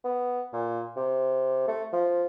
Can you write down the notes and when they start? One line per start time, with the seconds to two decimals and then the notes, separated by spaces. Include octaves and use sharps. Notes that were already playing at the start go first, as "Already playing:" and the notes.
0.04 B3
0.53 A#2
0.96 C3
1.68 A3
1.93 F3